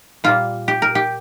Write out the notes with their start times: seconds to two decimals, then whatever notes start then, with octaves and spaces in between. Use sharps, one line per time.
0.24 A#2 G3 A#3 F4
0.68 G4
0.82 A#4
0.95 G4